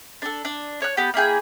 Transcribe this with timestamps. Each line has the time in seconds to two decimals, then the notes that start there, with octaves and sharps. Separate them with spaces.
0.22 D4 A4
0.45 D4
0.82 C#5 F#6
0.97 B3 G4
1.14 A#3 E4 G#4 G5